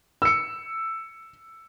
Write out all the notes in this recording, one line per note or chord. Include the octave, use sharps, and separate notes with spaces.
E6 C#7